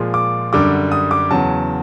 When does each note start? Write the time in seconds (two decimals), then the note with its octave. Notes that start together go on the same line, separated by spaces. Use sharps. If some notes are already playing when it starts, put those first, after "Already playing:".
Already playing: A#2 F3 G#3
0.14 D6
0.53 F#2 D3 G3 D6
0.92 D#6
1.11 D6
1.31 E2 C#3 F#3 A5